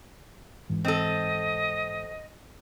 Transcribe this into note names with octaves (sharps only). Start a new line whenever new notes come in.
G#2 E3
C4 A4 D#5